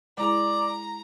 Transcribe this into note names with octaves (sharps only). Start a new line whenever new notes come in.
G#3 E4 G#4 D5 A#5